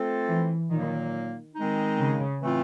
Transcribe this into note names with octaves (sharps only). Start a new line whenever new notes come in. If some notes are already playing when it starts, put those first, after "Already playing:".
Already playing: A3 C4 F4 A4 C5
E3
A#2 D#3 F#3 A#3
D#3 G#3 C4 D#4
C#3
A2 E3 A3 C4 F4